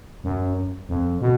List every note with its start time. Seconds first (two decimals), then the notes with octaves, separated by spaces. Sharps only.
0.24 F#2
0.89 F2
1.21 B2